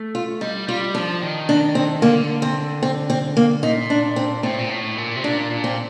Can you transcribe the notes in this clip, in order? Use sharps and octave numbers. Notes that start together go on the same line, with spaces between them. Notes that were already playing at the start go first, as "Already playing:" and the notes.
Already playing: A3
F4
G3 D#4
G3 F4
F3 D4
D#3
D4
C4
D3 A#3
C4
C4
C4
A#3
A#2 D#4
D4
C4
A2 C4
A#2
A2
A#2
C3
A#2 D4
A#2
C4